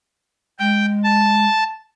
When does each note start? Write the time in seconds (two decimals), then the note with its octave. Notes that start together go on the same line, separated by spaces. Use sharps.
0.59 G#3 G5
1.04 A5